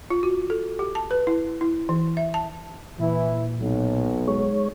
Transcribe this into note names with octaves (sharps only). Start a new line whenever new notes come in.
F4
F#4
A4
G4
A5
B4
E4
E4
E3
E5
A5
A#2 E3 E4
B1 F#3
G#3 C#5